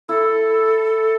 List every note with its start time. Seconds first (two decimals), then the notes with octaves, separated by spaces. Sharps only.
0.09 E4 A4